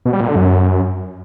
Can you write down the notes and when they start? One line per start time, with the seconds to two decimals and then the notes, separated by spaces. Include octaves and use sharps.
0.05 B2
0.13 G3
0.20 A#2
0.28 D3
0.36 F#2